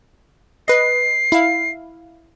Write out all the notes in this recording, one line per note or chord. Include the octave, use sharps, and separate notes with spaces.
B4 D#5 C7
E4 F5